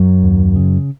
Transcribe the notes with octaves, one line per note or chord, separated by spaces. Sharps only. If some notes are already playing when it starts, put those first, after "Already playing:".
Already playing: F#2 F#3
D#2
C#3